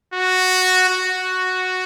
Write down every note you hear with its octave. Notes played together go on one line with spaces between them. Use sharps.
F#4
F#4